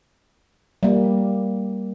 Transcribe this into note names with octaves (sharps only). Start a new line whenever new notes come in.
G3 A#3